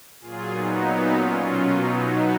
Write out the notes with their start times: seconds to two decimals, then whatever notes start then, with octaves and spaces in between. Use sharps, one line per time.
0.21 A#2 F#3 F4 G#4
0.51 B3 D#4
1.10 C#4 F4
1.40 B2 F#3 C#4 F4
1.70 B3 D#4
2.01 B3 D#4